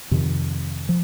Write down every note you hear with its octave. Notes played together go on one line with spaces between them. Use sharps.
F2 C3 D#3
F3